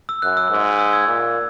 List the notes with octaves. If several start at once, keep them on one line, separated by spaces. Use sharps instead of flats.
E6
F#2 F#6
E6
G#2
E6
E6 G#6
A#2